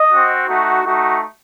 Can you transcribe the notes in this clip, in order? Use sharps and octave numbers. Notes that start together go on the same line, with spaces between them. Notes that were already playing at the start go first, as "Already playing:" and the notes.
Already playing: D#5
C4 F#4
A3 D#4 F#4
A3 D#4 F#4